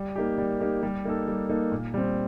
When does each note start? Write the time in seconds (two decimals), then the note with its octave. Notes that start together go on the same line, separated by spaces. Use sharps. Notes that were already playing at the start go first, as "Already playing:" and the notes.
Already playing: G3
0.16 A#3 D#4 G4
0.38 G3
0.60 A#3 D#4 G4
0.83 G3
1.05 A#3 D#4 A4
1.28 G3
1.50 A#3 D#4 A4
1.72 A#2
1.94 G3 C4